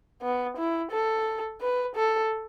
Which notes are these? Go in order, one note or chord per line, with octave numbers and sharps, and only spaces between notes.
B3
E4
A4
B4
A4